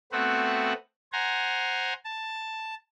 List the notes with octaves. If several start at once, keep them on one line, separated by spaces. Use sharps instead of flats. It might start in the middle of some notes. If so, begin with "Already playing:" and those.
A3 B3 C4 F#4 B4 F#5
C5 F#5 G#5 A#5
A5